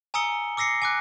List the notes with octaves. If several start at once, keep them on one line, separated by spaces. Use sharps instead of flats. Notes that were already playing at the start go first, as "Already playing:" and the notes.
G#5 A#5 D#6 E6 C#7 G7
D6 E6 A#6 C7 C#7
G#5 D6 F#6